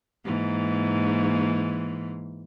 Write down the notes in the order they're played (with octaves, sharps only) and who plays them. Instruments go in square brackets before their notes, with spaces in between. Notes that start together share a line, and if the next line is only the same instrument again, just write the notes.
[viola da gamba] G#2 E3 A#3